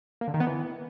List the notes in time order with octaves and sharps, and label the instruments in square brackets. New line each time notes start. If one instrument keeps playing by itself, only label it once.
[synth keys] A#3
D3
D#3
B3
E3